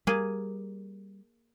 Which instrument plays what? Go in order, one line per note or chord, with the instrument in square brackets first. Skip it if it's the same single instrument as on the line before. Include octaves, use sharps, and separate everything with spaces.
[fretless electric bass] G3 [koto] A#3 G#4